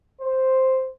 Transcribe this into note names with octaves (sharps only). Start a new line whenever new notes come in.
C5